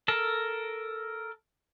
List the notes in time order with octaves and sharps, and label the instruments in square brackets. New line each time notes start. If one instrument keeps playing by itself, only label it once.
[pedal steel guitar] A4 A#4 A5